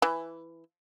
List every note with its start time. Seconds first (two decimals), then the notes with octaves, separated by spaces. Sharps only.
0.02 E3